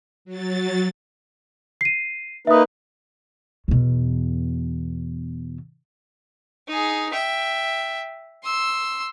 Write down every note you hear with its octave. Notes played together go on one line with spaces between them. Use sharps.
F#3 A6
C7 D#7
A#3 D#4 B4 E5 D#6
E2 B2
D#4 G#4
E5 G5
C6 E6